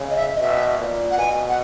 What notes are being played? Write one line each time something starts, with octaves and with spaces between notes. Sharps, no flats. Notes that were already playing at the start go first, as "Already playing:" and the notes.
Already playing: C#3
D#5
E5
D#5
B2 E5
A#2
F#5
B2 G#5
F#5